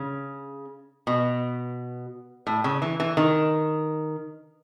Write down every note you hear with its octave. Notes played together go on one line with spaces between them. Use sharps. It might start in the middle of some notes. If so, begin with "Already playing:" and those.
Already playing: C#3
B2
A2
C#3
E3
E3
D#3